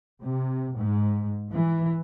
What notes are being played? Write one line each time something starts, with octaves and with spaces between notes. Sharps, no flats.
C3
G#2
E3